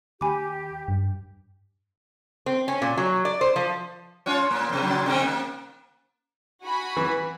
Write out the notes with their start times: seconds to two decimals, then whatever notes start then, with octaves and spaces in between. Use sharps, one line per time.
0.21 D#2 G4 G#5 B5 D6
0.88 G2
2.46 C4
2.68 C#4
2.82 A#2
2.98 F#3
3.25 D5
3.41 C5
3.56 F3
4.26 C#4 F4 C#5
4.51 A#2 A#3
4.69 F2 C3
4.82 A#2 C#3 F#3
5.06 C3 D#3 C4
5.23 A#3
6.64 F#4 G#5 B5
6.97 E3